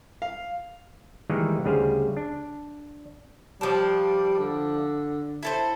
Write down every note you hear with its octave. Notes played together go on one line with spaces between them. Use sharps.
F5
D#3 E3 G3 G#3 A#3 D#4
D2 C#3 G3 G#4 C5 F5
D4
F3 G3 D4
D3
E4 A4 C5